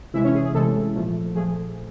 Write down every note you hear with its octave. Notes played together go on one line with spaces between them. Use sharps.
C3 E3 G#3 E4 E5
C#4 C#5
G#4
G#4
C3 E3 G#3 A3 A4
A#2 F3 A3
A#2 F3 A3 G#4